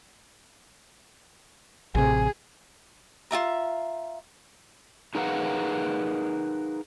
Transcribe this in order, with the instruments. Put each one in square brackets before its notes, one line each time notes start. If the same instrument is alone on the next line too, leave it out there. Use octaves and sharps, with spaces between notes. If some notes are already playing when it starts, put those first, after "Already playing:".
[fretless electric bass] A1 C3 [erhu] G#4
[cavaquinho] F4 F#4 E5 A#5
[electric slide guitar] D#4 G#4 A#4 B4 F5 F#5